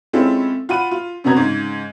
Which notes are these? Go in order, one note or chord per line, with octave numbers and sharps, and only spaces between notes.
G#3 C4 C#4 E4 F4 A4
F4 F#5 B5 D#7
F4
F#2 C3 B3 A#5 G#6
G#2 C#3